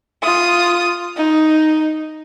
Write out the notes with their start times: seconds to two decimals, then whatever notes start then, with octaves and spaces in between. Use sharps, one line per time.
0.23 F4 D#6
1.17 D#4